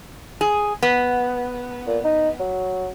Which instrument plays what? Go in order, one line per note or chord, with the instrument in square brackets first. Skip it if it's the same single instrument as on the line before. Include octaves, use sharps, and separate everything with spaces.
[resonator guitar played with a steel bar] G#4
B3
[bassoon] A#2
D#4
F#3